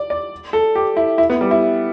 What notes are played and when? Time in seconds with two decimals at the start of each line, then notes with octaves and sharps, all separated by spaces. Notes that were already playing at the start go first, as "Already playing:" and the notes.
Already playing: D5
0.10 D5
0.53 A4
0.75 G4
0.97 E4
1.18 E4
1.30 B3
1.41 G3
1.51 E4